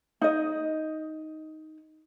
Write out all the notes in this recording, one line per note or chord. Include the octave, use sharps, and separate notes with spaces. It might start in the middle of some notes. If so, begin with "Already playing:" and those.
D#4 D#5